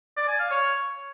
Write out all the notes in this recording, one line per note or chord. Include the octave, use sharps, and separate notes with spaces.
D5
G#5
F5
C#5